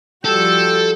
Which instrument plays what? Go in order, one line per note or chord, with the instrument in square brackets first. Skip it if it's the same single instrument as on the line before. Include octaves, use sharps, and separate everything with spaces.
[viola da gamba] F3 G3 F#4 [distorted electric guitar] A4 [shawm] G5 [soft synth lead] E6